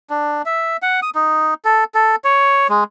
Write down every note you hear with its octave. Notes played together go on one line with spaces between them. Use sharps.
D4
E5
F#5
D#6
D#4
A4
A4
C#5
G#3